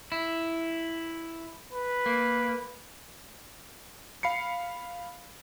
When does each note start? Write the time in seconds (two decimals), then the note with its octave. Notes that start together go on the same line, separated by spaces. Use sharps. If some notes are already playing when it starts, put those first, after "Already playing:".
0.12 E4
1.73 B4
2.06 A#3
4.23 F5 B5 C7 C#7